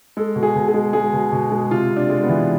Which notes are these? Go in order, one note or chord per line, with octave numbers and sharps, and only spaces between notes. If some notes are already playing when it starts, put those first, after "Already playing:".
G#3 A4
B2
G#4
B2
G#4
G#3
G#3 G#4
B2
B2
G#3
C3 F4
C3
D4
G#3
B3
E3